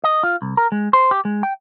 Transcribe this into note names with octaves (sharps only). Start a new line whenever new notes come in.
D#5
F4
C2
A#4
G#3
C5
G4
G#3
G5